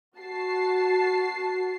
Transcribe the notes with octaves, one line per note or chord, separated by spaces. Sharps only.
F#4 A5 C7